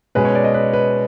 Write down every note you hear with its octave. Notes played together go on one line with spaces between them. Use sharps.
B2 G#3 C#4 B4
C#5
D5
D#5
B4
B4